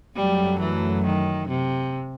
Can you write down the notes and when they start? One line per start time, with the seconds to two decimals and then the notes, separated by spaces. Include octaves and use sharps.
0.16 F#2 F#3 G3 A3
0.60 E3
1.05 D#3
1.49 C3